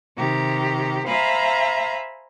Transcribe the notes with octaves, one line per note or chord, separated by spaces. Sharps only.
C3 D#3 G4 A#5
C5 E5 F5 G#5 A#5 B5